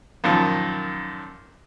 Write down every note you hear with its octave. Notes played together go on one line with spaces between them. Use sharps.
F#2 A#2 D#3 F3